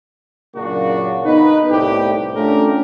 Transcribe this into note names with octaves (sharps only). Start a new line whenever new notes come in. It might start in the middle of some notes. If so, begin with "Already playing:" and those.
F#2 A#2 C#3 A#3 D4 F#4
B3 D#4 B4
C2 A2 G4
A3 C#4 D4 F4 G4 A#4